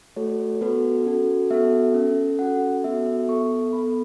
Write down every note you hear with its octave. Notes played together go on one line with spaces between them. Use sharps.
A3 F#4 A4 C#5
B3 F#4 A4 B4
C#4 F#4 A4
B3 F#4 A4 E5
C#4 A4
C#4 F#4 A4 F#5
B3 F#4 A4 E5
E5
B3 A4 C#6
B3 A4 B5